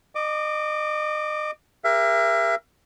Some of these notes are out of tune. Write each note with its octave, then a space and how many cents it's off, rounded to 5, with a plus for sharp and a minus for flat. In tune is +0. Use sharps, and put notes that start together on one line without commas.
D#5 -30 D6 +0
G4 +45 A#4 +20 E5 +35